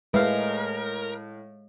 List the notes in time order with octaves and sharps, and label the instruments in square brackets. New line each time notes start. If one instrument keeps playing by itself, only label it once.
[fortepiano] A2 F5 [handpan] G#3 [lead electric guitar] A#4 [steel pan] B4 E5